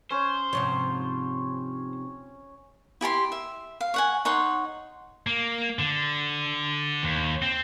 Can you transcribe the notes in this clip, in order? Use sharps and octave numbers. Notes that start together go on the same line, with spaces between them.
C#4 C5 C#5
G#2 C3 F3 C#5
E4 G4 A5 C6
E5
F5
C#5 F#5 G#5
D#4 C#5 F#5 C6
A#3
D3
D#2
C4